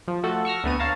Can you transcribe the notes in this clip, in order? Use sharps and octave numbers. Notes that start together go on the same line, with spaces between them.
F3
F3 A3 F#4 A4
C#6 E6 F6 A#6
D2 A3 B3 D#7
C#5 F5 A5 A#5